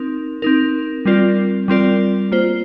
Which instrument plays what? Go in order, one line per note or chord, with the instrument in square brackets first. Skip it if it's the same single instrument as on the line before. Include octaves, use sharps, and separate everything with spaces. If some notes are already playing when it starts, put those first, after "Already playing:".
Already playing: [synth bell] C4 D#4 A#4
C4 D#4 A#4
G3 C4 F4 A#4 D5
G3 C4 F4 A#4 D5
A#3 F4 C5